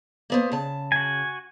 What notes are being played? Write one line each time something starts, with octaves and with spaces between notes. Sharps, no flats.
A#3 B3 C5
C#3 A5
F#4 G#5